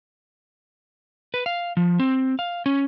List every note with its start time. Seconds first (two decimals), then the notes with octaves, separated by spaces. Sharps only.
1.34 B4
1.46 F5
1.77 F3
2.00 C4
2.39 F5
2.66 C#4